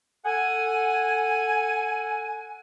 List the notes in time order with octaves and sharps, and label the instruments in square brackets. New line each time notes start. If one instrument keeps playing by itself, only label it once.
[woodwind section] A4 F#5 G#5